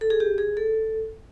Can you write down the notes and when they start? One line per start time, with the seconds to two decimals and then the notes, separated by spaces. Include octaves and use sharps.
0.01 A4
0.10 G#4
0.20 G4
0.38 G#4
0.57 A4